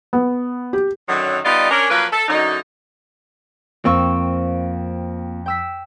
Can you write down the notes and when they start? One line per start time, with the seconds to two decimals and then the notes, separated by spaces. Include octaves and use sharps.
0.13 B3
0.73 G4
1.09 F#2 D3 D#3 F#3
1.45 G3 B3 D#4 F4 D5 D#5
1.70 C#4 D4 A#4
1.90 F3 F#3 A#3 A#4 B4
2.12 A4
2.29 F#2 D3 F#3 D#4
3.85 F2 A#3 C4 F4 C#6 E6
5.46 G5 E6 B6